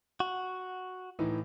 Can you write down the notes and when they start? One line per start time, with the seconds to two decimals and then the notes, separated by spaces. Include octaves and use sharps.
0.20 F#4
1.19 A2 E3 D#4